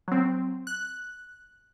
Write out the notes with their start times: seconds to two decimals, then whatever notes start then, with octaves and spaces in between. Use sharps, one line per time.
0.08 F#3 C4
0.67 F#6